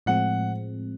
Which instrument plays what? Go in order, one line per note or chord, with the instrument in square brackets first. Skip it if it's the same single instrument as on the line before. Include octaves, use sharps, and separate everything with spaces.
[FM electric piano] A2 F3 G#3 C4 [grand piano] F#5